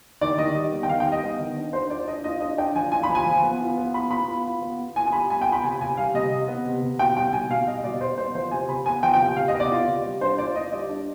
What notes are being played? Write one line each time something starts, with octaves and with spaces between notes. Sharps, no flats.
D#3 D5
D#3 D#5
G3
B3
G5
D#3 F5
G5
G3
D#5
B3
D#3
D4
D4 C5
F4 D5
D4 D#5
F4 D#5
D4 D#5
D4 G5
F3 G#5
F4 G#5
B5
F3
G#5
F3
B3
F4
B3
F4 B5
B3 B5
F4
F4
B3
B3
F4 G#5
G#5
G3 B5
B3 G#5
G5
F4
B5
C3 G#5
C3 G#5
G3 F5
C3 D#5
C3
B3
C3
C3
B2 G5
G3 G5
B2 G#5
B2 F5
G3 D#5
D#5
B2 D5
G3 C5
B3 C5
F3 C5
C3 G#5
C3 B5
B3 G#5
F3 G5
G5
C3
C3 F5
D#5
B3
D5
F4
C3
G3
D4 C5
F4 D5
F4 D#5
G3 D5
D4